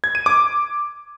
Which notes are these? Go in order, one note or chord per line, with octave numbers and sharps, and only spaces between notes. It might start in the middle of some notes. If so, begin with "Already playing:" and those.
G#6
D#7
D6